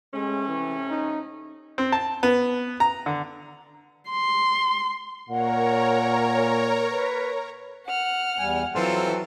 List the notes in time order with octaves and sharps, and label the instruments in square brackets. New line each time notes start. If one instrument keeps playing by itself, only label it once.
[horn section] C3 A3 C#4 [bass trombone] G#3
[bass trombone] E3
D#4
[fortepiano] C4
A5
B3
A#5
D3
[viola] C6
[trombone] A#2 [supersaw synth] A#4 C#5 A#5 [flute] F#5
[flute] B4
[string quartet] F#5 F6
[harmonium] E2 G3 G#5
[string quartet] E3 [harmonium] F#3 [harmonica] C4 F4 A4